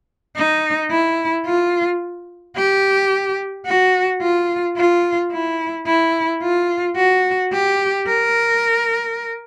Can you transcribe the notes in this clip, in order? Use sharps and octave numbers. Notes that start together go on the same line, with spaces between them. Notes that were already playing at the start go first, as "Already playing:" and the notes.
D#4
E4
F4
G4
F#4
F4
F4
E4
E4
F4
F#4
G4
A#4